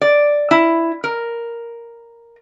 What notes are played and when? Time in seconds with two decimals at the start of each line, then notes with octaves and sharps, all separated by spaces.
0.01 D5
0.51 E4
1.04 A#4